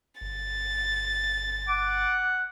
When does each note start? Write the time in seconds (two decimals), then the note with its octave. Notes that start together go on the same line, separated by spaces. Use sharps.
0.21 G1 A6
1.68 F#5 D6